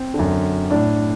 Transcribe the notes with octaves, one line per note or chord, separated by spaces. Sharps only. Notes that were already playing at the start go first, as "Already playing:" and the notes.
Already playing: C4
D3
F#2
A2 D4